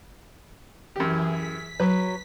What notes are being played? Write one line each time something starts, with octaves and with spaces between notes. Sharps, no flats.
F#2 E3 E4 G4 G#4
B6
F#3 B4